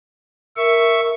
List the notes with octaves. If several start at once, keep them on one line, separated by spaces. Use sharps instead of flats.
A#4 E5 C#6